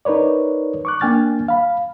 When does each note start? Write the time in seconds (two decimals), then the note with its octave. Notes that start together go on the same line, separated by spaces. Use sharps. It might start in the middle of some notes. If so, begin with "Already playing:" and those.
0.05 D#4 A#4 B4 C#5 D5
0.85 C#6 D6 F#6
1.01 A#3 D4 G5 G#5 F6 A6
1.48 F5 B5